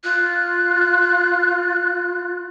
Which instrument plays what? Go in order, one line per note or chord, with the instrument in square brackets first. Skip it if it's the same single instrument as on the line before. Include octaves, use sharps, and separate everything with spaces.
[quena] F4 [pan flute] F#6